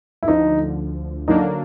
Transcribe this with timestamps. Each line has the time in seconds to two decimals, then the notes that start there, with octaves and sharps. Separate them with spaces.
0.23 E4
0.28 D2 D3 F3 D#4
1.28 D3 F#3 A#3 D4 D#4